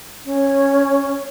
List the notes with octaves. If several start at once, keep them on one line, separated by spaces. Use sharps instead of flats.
C#4